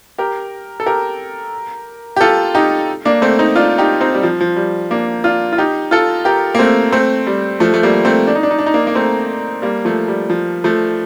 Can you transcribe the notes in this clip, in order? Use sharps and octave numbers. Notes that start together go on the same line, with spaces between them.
G4 A#4
A4
G4 A#4
G4
F4 A4
D#4 G4
A#3 D4
A3 C4
C4 D#4
D4 F4
D#4 G4
C4 D#4
G3
F3
F3
G3
A#3 D4
D4 F4
F4
D#4 G4
F4 A4
G4 A#4
A#3
A3 C4
A3 C4
G3
F3 A3
A3
G3 A#3
A3 C4
D4
D#4
D4
D#4
D4
D#4
A#3 D4
A#3
A3 C4
G3 A#3
F3 A3
G3
F3
F3 A3